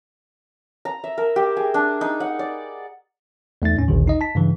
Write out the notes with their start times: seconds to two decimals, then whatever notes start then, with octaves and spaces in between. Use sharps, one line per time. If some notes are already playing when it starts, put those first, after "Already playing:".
0.85 A#5
1.04 E5
1.18 A#4
1.36 G4
1.57 G#4
1.74 D4
2.01 D#4
2.20 F#5
2.39 D5
3.62 E2 A3 D#4 A6
3.76 D#2 A2 C#4
3.88 A1 D#2 A#2 D3 D#3
4.07 D#4 D#5
4.21 A5 B6
4.35 G2 C#3 E3